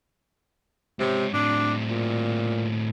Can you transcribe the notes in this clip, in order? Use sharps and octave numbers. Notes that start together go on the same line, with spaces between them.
G#2 C3 C#5
A2 C4 D4
A#2